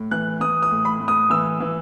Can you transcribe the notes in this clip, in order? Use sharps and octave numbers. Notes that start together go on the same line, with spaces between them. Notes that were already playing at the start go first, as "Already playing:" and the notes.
Already playing: A2
E3 F#6
E3 D#6
D#6
A2
B5
A2
D#6
E3 E6
E3